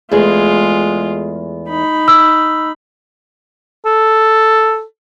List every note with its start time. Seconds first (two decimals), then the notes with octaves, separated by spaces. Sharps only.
0.11 E2 G#3 A3 F4 G#4
1.69 D#4 B5
2.08 E6
3.86 A4